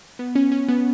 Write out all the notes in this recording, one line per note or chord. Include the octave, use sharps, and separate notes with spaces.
B3
C#4
C#4
B3